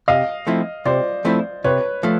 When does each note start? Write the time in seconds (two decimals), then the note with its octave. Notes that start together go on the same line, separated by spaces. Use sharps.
0.08 C3 D#5 F5
0.47 F3 A3 C4 E4
0.85 C3 C5 D5
1.25 F3 A3 C4 E4
1.64 C3 B4 C#5
2.03 F3 A3